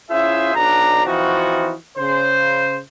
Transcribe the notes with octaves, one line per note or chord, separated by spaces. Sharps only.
C#4 E4 F4 G#4 C5 E5
B1 D4 A#5
E3 F3 C4 D#4 F4 F#4
C#3 C5